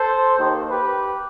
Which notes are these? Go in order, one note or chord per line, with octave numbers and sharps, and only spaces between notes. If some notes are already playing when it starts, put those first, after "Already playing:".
Already playing: A4 C5
D#2 D#3
G4 B4